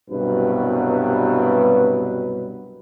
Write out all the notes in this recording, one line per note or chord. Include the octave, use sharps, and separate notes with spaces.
C2 G2 B2 F#3 B4